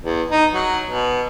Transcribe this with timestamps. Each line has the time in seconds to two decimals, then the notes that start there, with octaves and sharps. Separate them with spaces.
0.03 E2
0.31 D#4
0.54 F#3
0.86 B2